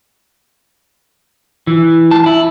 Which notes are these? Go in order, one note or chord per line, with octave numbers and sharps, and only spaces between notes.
E3
A5
E4